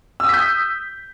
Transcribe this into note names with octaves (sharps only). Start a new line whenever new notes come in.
D#6 E6 G6 B6